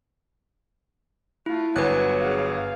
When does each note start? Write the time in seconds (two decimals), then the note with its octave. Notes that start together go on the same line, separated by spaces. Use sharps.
1.46 A3 E4 F4
1.76 G1 F#3 B4 G#5 F#6
2.18 G#4 F5